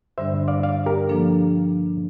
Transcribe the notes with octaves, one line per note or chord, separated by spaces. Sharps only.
G2 D3 G3 D4 C5 E5
D5 F5
D5 F5
G4 A#4
F3 A#3 D4 A4